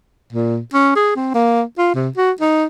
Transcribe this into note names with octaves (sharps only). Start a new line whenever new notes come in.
A#2
C#4
G#4
C4
A#3
F4
C3
F#4
D#4